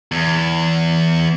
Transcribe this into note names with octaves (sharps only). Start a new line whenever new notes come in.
E2